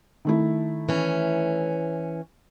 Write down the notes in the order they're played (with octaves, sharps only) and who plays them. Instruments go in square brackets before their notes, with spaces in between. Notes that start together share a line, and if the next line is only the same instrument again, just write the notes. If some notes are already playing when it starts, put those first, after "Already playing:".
[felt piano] D#3 A3 E4
[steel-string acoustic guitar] E3 C#4